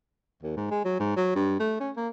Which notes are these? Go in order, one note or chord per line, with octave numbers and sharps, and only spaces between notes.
D#2
G#2
G#3
F#3
G#2
F#3
G2
A3
C#4
A#3